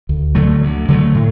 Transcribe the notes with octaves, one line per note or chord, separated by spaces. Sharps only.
D2
D3 F#3 A3
D2
D3 F#3 A3
A2